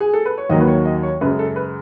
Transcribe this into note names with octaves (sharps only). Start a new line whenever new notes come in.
G#4
A4
B4
C#5
D#2 D#3 F#3 D#5
B4
C#5
D#5
C#5
F#2 C#3 G#3 B4
A4
B4